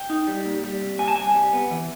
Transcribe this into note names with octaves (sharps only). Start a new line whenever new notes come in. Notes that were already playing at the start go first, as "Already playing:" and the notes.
Already playing: G5
D#4
G3
A#2
G3
C2
A#2 G#5
A5
C2 G#5
G3
B3
E3